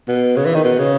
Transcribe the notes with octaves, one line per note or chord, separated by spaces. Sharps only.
B2
C#3
E3
D#3
B2
C#3